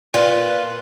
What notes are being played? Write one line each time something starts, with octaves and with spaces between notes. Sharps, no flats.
A#2 F4 B4 D5